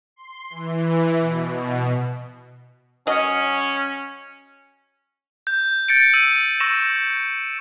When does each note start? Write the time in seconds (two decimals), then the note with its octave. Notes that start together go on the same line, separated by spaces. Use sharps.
0.16 C6
0.50 E3
1.20 B2
3.07 F#3 C#4 D#5
5.47 G6
5.88 G6 A6 C#7 D7
6.14 E6 D#7
6.60 C#6 E6 A#6 E7